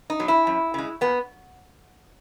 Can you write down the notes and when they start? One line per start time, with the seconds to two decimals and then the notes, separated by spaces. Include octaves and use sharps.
0.10 D#4
0.20 B2 F#3
0.28 E4
0.47 F#2
0.74 C#3 G#3
1.01 A#2 B3